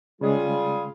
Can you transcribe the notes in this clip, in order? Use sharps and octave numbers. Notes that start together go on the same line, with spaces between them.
C#3 G3 G#3 F4 G#4